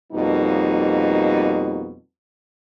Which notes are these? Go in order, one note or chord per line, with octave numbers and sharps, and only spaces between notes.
F2 B2 G3 A#3 D#4